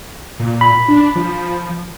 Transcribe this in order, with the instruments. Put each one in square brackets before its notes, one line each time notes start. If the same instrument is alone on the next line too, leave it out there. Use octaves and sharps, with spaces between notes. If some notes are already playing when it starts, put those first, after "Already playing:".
[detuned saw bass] A#2
[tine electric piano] B5
[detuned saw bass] D4
F3